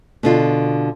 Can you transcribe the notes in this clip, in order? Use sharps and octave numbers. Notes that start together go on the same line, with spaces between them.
B2 D3 F4